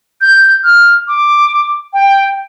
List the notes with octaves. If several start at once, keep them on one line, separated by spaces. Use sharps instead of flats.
G6
F6
D6
G5